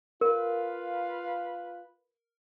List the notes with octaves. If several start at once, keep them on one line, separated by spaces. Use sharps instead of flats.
F4 A#4 B4 F5